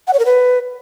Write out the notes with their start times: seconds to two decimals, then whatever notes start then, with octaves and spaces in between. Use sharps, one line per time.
0.07 F#5
0.13 C#5
0.19 A#4
0.25 B4